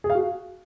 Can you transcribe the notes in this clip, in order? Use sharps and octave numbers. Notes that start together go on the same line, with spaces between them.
G#4
F5
F#4